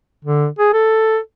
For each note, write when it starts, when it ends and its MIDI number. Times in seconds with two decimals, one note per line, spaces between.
0.25 0.47 50
0.59 0.70 68
0.73 1.18 69